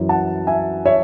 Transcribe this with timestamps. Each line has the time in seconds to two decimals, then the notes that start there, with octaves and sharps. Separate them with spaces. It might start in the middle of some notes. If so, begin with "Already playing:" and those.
Already playing: F#2 E3
0.09 F#5 A5
0.47 E5 G#5
0.85 C#5 E5